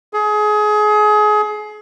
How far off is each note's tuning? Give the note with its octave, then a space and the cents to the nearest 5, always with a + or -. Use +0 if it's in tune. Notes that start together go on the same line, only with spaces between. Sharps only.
G#4 +25